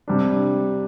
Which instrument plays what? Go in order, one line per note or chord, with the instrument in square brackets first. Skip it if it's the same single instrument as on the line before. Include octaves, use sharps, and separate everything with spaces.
[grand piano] C3 G3 D4